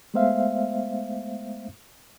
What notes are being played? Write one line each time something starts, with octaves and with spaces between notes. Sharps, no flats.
G#3 A3 B3 C5 E5 F5